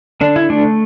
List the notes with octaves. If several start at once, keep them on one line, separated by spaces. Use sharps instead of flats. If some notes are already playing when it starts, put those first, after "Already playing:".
D3 D4
E4
A3 D4